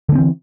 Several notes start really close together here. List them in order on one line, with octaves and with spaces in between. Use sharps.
D3 A3 C4 E3